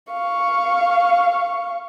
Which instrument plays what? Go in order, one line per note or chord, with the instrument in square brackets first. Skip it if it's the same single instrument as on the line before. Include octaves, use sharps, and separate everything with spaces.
[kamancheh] F5 C#6